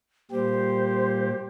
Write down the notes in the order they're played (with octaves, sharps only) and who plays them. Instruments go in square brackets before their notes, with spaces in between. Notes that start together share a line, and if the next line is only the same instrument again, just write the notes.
[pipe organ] A#2 G3 G4 [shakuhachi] C5